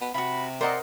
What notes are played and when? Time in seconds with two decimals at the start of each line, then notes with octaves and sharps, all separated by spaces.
0.01 B3
0.14 C3 F4 F#4 B5
0.61 A#4 C5 D5 D#5 F#5 C6